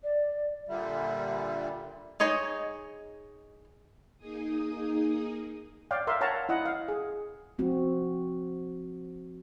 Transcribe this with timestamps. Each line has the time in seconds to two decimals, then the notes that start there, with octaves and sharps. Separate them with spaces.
0.03 D5
0.68 A#2 D3 G3 E5
2.20 D#4 G#4 C#5 D#5
4.18 A#3 D#4 G#4 D#6
5.91 C#5 D5 F5 G5
6.07 A#4 E5 F5 C6
6.21 C#5 F5 F#5 A5 A#5
6.49 E4 D#5 F#5
6.66 F5
6.88 G#4
7.58 F3 C4 F#4